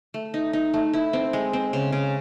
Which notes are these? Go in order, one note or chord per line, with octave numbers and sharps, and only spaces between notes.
A3
D#4
D#4
A3
E4
C4
G#3
C4
C#3
C#3